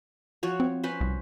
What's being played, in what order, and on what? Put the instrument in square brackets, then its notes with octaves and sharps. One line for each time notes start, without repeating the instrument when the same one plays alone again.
[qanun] F3 F#4 C#5
[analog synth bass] C4
[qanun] C#4 B4 C5
[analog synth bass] C2